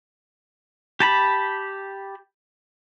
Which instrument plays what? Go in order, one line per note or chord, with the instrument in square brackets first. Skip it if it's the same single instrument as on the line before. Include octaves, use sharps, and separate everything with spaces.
[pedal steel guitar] G4 A5 B5